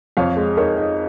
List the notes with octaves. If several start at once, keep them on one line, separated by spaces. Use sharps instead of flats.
F2 C#5 F5
G#3
D#4 A#4 C#5
D#4